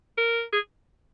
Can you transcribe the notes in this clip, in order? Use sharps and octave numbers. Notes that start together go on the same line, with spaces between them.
A#4
G#4